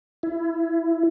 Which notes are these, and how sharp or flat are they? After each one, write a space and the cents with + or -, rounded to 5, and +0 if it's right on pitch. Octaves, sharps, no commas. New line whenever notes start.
E4 +20